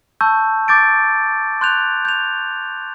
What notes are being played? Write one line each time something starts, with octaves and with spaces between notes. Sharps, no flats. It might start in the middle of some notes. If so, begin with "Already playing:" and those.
A5 C#6 E6 G6
D6 G6 A6 D7
C6 F#6 G6 F7
G6 F7